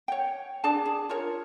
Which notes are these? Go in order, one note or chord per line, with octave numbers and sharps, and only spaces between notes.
C#5 G5
D4 G#4 D5 A5
G#4
F4 A#4 C#5